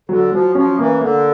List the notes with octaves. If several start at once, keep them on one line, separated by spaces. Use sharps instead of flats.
D3 F#3
F3 F#3
F3 C#4
E3 A#3
C#3
D3 A#3